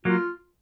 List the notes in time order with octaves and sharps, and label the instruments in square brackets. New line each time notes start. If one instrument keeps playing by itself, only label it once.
[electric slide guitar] F#3 A#3 [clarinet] F4